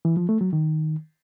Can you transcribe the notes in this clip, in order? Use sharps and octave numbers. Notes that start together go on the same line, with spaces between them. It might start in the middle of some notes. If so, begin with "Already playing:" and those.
E3
F3
A3
F#3
D#3